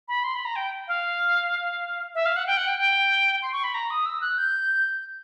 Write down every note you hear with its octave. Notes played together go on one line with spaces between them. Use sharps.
B5
C6
B5
A#5
G5
F5
E5
F5
F#5
G5
F#5
G5
G5
C6
C#6
B5
A#5
D#6
E6
F#6
G6